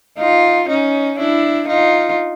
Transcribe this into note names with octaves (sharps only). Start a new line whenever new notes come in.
D#4 F4
C#4 D#4
D4 E4
D#4 F4